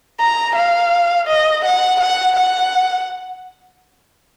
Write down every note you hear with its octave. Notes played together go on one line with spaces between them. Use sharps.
A#5
F5
D#5
F#5
F#5
F#5